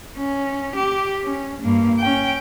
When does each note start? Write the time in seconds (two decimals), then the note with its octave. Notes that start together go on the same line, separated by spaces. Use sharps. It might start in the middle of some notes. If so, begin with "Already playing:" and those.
0.18 C#4
0.76 G4
1.23 C#4
1.62 G2 A#3
2.00 C#4 G5